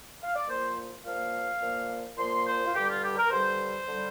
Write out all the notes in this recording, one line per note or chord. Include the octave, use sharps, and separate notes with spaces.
F5
D5
A#2 F3 A#3 C5
A#2 F3 A#3 F5
A#2 F3 A#3
A#2 F3 A#3 C6
C5
F4
G2 D3 G3 G4
F4
G4
A#4
G2 D3 G3 C5
D3 G3